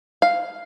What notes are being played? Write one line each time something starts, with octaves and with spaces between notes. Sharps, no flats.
F5